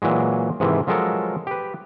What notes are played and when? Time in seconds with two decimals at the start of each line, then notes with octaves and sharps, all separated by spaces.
0.02 A#2 E3 F#3 G#3
0.60 G#2 C3 D#3 E3
0.87 F3 F#3 G#3 A4 A#4
1.47 G4 B4